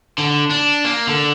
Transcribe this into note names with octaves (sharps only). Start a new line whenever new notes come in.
D3
D4
A#3
D3